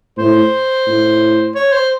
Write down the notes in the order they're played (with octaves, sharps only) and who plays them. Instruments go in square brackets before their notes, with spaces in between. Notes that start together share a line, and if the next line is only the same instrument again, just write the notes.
[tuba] A2 [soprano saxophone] C5
[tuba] A2
[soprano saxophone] C#5
C5